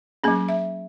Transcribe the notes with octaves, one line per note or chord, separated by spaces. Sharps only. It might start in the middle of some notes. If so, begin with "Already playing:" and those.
F#3 A#3 C#4 G#4
E5